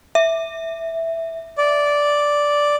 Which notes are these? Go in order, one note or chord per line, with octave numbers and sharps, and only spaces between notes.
E5
D5